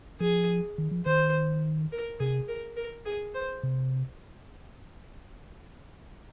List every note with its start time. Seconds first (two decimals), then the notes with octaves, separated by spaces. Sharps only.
0.20 F3 G#4
0.78 D#3
0.91 F3
1.06 D#3 C5
1.92 A#4
2.20 C3 G#4
2.48 A#4
2.77 A#4
3.06 G#4
3.35 C5
3.63 C3